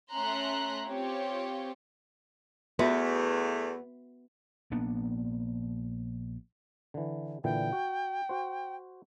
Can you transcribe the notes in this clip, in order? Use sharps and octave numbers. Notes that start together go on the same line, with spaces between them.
A3 C#4 E5 A#5 C6 F#6
C4 F4 G4 C#5
E2 A3 B3 F#4 E5 C6
A#1 A#3 B3 D4
D3 E3
A#2 D3 E3 G5
F#4
F#4 C5